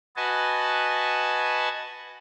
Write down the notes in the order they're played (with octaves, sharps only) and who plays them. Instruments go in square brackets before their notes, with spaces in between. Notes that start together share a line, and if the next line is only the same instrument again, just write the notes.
[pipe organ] F#4 B4 D#5 G#5 A5